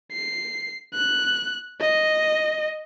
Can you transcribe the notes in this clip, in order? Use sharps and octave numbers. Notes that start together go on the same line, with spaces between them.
C7
F#6
D#5